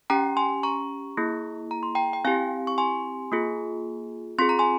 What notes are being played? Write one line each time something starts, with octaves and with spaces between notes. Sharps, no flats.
C#4 G4 G5 A#5
G#5 C6
A#5 C#6
A#3 E4 G#4
A#5
C6
G5 A#5
G5
C4 E4 G4 F5 G#5
C#6
G#5 C6
A#3 F4 G#4
C4 F4 G#4 C6
A#5
G#5 C6